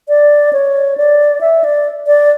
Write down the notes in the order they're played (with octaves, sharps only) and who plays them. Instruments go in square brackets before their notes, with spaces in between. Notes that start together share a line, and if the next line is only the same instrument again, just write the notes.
[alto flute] D5
C#5
D5
E5
D5
D5